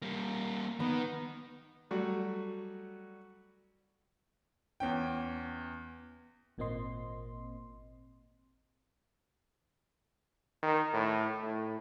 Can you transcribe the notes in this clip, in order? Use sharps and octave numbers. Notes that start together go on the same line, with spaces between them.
G3 A#3
D#3 B3
F#3 G3 A3 F#4
E2 C#4 G5
G#1 A#2 A#3 C4 D#5 C6
D#3
A2
A2